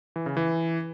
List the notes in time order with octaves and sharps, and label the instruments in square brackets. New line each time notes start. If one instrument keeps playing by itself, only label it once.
[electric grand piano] E3
C#3
E3